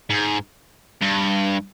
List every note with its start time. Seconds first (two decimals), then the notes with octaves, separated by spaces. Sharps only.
0.10 G#2
1.01 G2